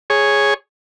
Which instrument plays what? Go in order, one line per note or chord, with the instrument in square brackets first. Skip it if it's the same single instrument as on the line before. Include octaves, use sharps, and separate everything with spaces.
[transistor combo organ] G#4 C#5